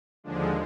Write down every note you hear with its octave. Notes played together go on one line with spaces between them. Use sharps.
D#2 D3 F3 G#3 D4